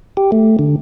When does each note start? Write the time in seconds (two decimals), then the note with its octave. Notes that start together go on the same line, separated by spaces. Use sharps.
0.17 G4
0.32 A3
0.59 D3